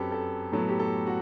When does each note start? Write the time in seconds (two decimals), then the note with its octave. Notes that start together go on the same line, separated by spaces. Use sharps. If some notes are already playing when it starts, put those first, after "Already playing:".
Already playing: F#2 F#3 C4 G4 A4 B4
0.12 A4
0.52 A2 F#3 B3 A4
0.69 G4
0.80 A4
1.07 F#4